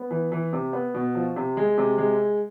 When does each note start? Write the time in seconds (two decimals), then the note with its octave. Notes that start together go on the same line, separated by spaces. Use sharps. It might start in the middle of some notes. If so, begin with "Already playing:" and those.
Already playing: B3
0.11 E3
0.32 E3
0.53 C3
0.73 B3
0.94 B2
1.15 F3
1.36 C3
1.57 G#3
1.78 C3
1.98 G#3